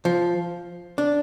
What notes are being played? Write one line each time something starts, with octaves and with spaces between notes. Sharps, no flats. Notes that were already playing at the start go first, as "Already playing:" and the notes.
F3
D4